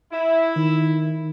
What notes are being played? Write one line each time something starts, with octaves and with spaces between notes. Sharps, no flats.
E4
D#3